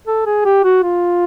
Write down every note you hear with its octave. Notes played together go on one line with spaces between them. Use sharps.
A4
G#4
G4
F#4
F4